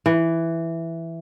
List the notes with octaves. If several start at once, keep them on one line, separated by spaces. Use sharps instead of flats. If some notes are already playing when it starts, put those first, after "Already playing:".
E3